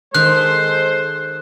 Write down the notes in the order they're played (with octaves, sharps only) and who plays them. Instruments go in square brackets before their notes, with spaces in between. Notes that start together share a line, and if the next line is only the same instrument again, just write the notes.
[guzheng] D#3 [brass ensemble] G#3 A4 C5 [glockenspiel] F#6